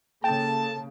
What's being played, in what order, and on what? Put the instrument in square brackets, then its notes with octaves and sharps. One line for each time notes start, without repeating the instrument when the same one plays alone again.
[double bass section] C#3 A#3 [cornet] A4 [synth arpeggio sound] G5 [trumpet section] A5